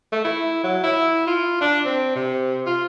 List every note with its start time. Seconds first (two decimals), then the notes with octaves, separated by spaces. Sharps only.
0.12 A3
0.25 E4
0.64 F#3
0.84 E4
1.27 F4
1.61 D4
1.85 C4
2.15 C3
2.66 F4